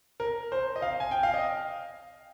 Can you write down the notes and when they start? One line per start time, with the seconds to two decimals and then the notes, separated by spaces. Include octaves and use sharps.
0.20 A#4
0.52 C5
0.76 D#5
0.82 F5
1.00 G#5
1.11 G5
1.23 F5
1.34 D#5